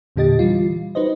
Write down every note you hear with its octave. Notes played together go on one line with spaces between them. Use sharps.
E2 A#2 D3 G4 D#5 A6
E3 G3 F4
D#4 F#4 B4 C5 D#5